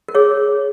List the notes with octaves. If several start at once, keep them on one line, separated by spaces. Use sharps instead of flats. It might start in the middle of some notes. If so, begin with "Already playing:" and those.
A#4
G#4 C#5